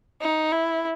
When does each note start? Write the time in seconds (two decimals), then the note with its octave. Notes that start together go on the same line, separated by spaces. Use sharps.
0.21 D#4
0.52 E4